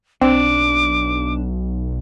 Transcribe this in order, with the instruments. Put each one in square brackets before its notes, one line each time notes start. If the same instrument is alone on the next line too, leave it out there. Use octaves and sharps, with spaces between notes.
[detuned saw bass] B1 [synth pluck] C4 [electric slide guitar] D4 [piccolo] D6